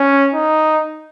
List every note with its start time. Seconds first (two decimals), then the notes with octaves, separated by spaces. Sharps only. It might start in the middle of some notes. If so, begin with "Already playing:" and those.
Already playing: C#4
0.34 D#4